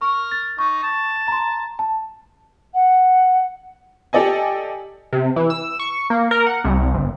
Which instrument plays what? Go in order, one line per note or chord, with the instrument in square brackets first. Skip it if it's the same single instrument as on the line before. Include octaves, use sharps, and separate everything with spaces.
[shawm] A#4 [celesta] C#6
[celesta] A6
[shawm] D#4 [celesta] C#6
[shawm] A5
[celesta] A#5 C6
A5
[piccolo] F#5
[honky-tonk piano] G4 A4 D5 D#5 G#5
[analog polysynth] C3
E3
E6
C#6
A#3
A#4
F#5
C2
G1